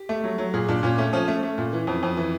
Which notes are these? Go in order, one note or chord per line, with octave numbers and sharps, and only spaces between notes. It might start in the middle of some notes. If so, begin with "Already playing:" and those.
Already playing: G4
A3
F#3
F#3
A#2 G#4
A#2 D4
A#2 C#4
A3 C#4
F3 C#4
A3
A3
A#2
E3
F2
F2
E3